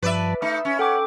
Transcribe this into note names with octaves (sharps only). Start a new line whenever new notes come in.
G2 F3 B4 D5 E5 A5
A3 D#4 E5 B5
C#4
A4 F#5 G5 D6